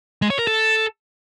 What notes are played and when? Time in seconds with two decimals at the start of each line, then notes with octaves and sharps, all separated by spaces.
0.22 G#3
0.30 C#5
0.39 A#4
0.47 A4